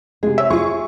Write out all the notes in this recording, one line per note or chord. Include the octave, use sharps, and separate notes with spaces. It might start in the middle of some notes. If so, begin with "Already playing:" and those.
C3 G#3 G#4
C4 C#5 E5
F4 G#4 C#6